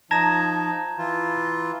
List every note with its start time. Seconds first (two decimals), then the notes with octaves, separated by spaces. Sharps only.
0.11 F3 D#4 A5 A#5 G#6 A#6 E7
0.98 E3 F4